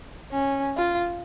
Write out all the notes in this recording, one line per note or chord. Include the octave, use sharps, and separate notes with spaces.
C#4
F4